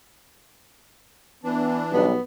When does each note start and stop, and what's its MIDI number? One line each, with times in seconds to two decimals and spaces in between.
1.44 2.05 52
1.44 1.79 59
1.44 2.05 62
1.93 2.14 35
1.93 2.14 55
1.93 2.22 59